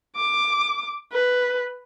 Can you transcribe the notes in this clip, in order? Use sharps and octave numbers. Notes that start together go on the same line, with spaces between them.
D6
B4